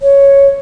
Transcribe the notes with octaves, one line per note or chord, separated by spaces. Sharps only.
C#5